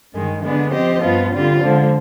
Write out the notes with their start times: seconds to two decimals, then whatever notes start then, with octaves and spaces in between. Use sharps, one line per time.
0.12 G2 D#3 G#3
0.42 D3 G#3 B3 D4
0.71 F3 C4 G4 C5 D#5
1.01 G2 F3 B3 F4
1.32 D3 G3 C4 F4
1.61 D3 F3 G#3